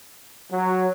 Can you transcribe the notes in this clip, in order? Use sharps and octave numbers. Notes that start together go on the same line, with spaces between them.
F#3